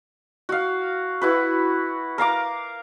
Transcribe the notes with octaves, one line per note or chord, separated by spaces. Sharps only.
F#4 F5
E4 F#4 B4
A#4 F5 A#5 D6